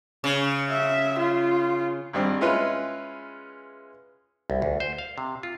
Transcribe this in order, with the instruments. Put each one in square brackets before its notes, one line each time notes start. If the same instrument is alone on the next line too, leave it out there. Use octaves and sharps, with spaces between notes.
[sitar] C#3
[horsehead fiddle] E5
F4
[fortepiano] G#1 G2 C4
G#3 C#4 E4 F4 B4
[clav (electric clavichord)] C2
D2
C5
F5
C3
F4